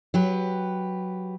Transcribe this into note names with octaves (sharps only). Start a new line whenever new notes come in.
F#3 G4 B4